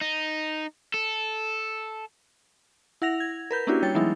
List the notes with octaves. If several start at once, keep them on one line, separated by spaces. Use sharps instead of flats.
D#4
A4
E4 F#5 A#6 F7
G#6
A#4 B4 G6
A#3 C#4 D4 E4 F#4 G4
G3 C#5 G5 A6
E3 F#3 G#3 B3 D#4 E4